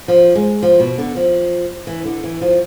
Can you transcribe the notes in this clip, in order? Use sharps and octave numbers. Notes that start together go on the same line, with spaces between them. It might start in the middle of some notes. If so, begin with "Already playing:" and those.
F3
G#3
F3
B2
D3
F3
E3
D3
E3
F3